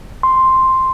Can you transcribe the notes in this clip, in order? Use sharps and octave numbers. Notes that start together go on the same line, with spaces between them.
C6